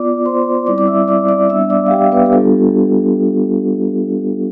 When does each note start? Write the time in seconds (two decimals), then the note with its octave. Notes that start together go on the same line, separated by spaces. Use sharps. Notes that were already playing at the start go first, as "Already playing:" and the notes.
Already playing: B3 F4 D5 D6
0.25 C5 C6
0.66 G3 C4 E4 D5 D6
0.78 D6
0.87 E5 E6
1.08 D5 D6
1.29 D5 D6
1.49 G3 B3 D4 E5 E6
1.70 D5 D6
1.86 F5
1.91 G4 G5
2.12 B3 B4
2.26 G4
2.32 G3 B3 D4 F4 A4